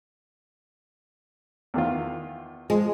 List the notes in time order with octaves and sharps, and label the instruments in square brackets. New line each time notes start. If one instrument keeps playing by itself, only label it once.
[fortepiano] E2 D#3 F4
[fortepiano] F3 [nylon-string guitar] G#3